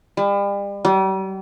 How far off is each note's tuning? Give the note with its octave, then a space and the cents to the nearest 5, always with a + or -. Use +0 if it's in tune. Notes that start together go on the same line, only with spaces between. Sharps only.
G3 +40
G3 -40